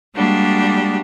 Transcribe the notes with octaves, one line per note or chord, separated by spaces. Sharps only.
G3 G#3 A#3 D4 F#4 G4